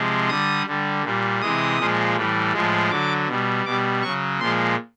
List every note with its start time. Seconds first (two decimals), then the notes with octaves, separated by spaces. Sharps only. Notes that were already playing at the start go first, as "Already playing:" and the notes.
Already playing: C3 F3 G#3
0.29 D3 G3 D#6
0.66 D3 G3
1.04 A#2 G3
1.41 C3 E3 G#3 D#6
1.79 A#2 F3 G#3
2.16 A2 E3 G3
2.53 A2 F3 G#3
2.91 D3 F#3 D6
3.28 B2 G3
3.65 B2 G3 D6
4.02 C#3 F#3 C#6
4.40 A#2 F3 G#3 C6